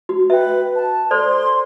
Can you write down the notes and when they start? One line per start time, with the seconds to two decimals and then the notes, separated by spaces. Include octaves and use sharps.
0.09 F#4
0.30 B4 E5 G5
0.76 A5
1.11 A4 C5 D5 C6